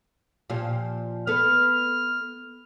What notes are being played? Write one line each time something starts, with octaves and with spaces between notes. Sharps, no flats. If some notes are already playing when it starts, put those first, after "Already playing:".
A#2 F3 G4
B3 A4 F6